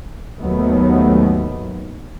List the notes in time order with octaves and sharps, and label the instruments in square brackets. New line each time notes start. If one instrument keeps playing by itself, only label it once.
[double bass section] D#2 G#2 D#3 F#3 A3 B3